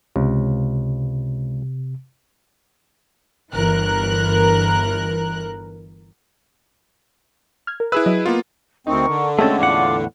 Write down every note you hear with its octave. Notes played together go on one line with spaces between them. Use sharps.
C#2 C3
G1 E3 A#4 F#6
F6 G#6
A#4
E4 G#4 B4 E5 E6 F#6
F#3 D#5
A#3 B3 F4
D2 C4 D#4 A#4 A#5 C#6
D3
G#3 A3 C4 C#4 F#4 A4
E2 A2 F4 F5 F#5 D6